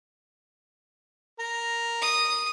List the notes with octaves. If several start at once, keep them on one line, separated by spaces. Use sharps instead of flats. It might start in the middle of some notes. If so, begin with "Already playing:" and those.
A#4
D#6